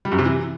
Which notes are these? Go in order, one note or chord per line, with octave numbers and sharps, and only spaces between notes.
G3
F#2
C3
E3